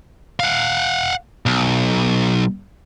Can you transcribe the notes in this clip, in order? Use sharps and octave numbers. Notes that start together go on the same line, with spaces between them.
F5 F#5
B1